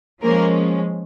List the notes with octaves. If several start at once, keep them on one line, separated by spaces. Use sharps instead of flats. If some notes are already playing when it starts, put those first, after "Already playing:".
F3 G#3 A#3 C#4 A#4